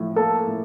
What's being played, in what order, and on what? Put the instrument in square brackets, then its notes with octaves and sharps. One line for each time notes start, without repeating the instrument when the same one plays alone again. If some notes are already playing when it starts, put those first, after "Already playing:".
Already playing: [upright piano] A2 F3
[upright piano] A#3 [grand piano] A4
[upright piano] A2